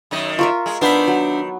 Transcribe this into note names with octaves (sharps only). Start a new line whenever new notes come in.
F#2 D#3 D#5
F4 A#4 E5 C#6
G#3
D#3 B3 D4 C5 E5 F5 C6
F#3